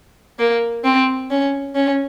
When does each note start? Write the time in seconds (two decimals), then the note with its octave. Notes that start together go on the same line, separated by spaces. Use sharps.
0.39 A#3
0.84 C4
1.30 C#4
1.75 C#4